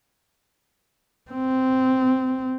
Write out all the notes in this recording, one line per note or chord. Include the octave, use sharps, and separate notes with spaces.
C4